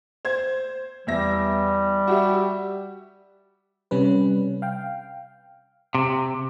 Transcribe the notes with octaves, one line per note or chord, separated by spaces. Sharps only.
C5 G#6
E2 G3 E5 A#6
F#4 G4 E5
C3 G3 C#4 B4
F5 G5
C3